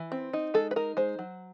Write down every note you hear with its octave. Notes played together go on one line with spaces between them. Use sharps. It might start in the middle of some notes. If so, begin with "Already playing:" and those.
Already playing: E3
C4
D#4
G#3 A4
B4
D#4 A#4
G#3 C5
F#3